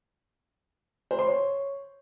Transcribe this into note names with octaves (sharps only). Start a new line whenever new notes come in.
C5
C6
C#5